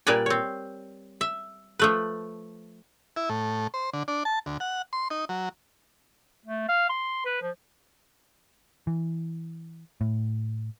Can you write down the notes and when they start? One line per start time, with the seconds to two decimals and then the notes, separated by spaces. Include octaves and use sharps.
0.07 A#2 G3 A#4 B4 D5 G#5
0.26 C4 C#5
1.21 E5
1.79 F3 A3 B4
3.16 E4
3.29 A2
3.74 C5
3.93 D3
4.08 D4
4.25 A5
4.46 D2
4.60 F#5
4.93 C6
5.10 D#4
5.29 F#3
6.46 A3
6.69 F5
6.89 C6
7.25 B4
7.42 F3
8.87 E3
10.01 A2